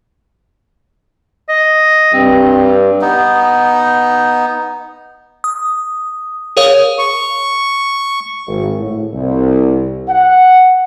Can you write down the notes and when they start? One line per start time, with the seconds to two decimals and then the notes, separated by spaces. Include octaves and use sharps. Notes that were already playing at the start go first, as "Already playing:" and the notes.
1.49 D#5
2.14 G2 C4
3.01 B3 D#4
5.44 D#6
6.57 G#4 A#4 C#5 F5 D#6
6.99 C#6
8.47 G#1
8.79 A2
9.13 C2
10.09 F#5